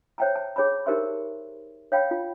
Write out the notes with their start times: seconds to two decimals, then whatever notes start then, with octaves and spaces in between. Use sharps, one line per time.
0.18 C5 C#5 E5 G5 A5 A#5
0.36 A5
0.56 G#4 C#5 A5 B5
0.86 D#4 G4 A#4 C5 E5 C6
1.92 C#5 F5 G5 B5
2.11 F4